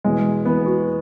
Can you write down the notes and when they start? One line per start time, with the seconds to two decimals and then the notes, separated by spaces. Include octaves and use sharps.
0.04 E1 E2 E3 G#3
0.45 E1 E2 E3 B3
0.66 F#4